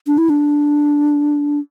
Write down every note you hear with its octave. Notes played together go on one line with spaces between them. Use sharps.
D4
E4
D4